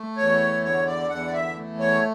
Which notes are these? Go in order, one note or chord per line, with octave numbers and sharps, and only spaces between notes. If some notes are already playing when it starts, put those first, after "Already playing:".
Already playing: A3
E2 C#5
D3 C#5
D5
E2 F#5
D5
E5
A3
C#5